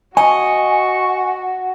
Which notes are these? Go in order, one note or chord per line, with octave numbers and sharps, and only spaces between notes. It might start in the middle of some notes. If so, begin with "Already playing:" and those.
F#4 D#5 G#5 C#6